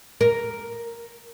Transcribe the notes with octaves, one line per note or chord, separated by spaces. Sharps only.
A#4